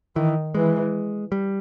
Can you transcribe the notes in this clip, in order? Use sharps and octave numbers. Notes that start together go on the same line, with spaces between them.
D#3 E3
E3 G#3
G3